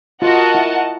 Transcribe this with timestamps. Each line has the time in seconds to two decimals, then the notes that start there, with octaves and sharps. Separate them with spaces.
0.21 F4 F#4 A#4 D#5 F#5 A5
0.55 E4